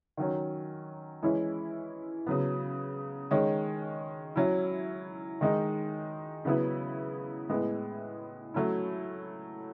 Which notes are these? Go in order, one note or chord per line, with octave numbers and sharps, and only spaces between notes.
D#3 F#3 C#4
E3 G#3 C#4 E4
C#3 F#3 B3
D#3 G#3 C#4
F#3 C#4 E4
D#3 G#3 D#4
C#3 F#3 B3 E4
A2 G#3 B3 E4
F#3 A3 C#4 E4